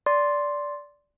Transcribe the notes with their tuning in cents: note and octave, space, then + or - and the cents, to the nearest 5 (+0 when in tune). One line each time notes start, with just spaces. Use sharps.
D5 -10 C6 +0